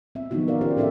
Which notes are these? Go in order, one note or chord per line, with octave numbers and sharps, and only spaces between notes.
C4 E5
D#3 F3 F#3 B3 D#4 F#4
A#4 D5 F5
C#4 F4 G4 C5
F3 C#4 D4 A4 D5 E5